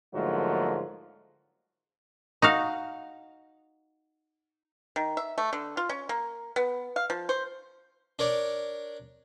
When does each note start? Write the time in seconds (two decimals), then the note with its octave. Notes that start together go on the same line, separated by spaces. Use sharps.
0.14 G#2 D3 F3 F#3 A3 A#3
2.42 D#4 F#4 F5
4.96 D#3
5.17 E5
5.38 A3
5.53 D3
5.77 F4
5.89 C#4
6.09 A#3
6.56 B3
6.96 F5
7.10 F3
7.29 C5
8.19 D4 A#4 C#5 D5